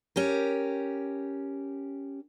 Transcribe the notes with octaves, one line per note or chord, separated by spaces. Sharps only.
C#4 G4 A#4